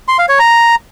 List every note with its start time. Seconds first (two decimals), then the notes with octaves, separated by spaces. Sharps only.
0.08 C6
0.19 F5
0.29 C#5
0.39 A#5